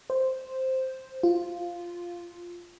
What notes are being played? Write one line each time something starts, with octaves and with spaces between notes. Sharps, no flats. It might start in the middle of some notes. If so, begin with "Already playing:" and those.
C5
F4